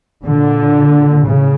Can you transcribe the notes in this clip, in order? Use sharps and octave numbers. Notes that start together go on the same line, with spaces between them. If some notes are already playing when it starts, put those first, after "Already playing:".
A#2 D3
A2 C#3